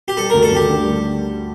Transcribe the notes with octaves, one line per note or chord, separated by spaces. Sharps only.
G4
G3 A4
D2 A#4
A4
D2 G4
D3
G3